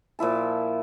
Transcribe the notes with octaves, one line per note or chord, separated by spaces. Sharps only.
A#2 F3 E4 A5